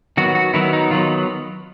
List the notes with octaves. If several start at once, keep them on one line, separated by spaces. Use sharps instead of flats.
D#3 F#3 B3 F#4
F#4
D#3 F#3 B3 E4
D#4
D#3 F#3 B3 F4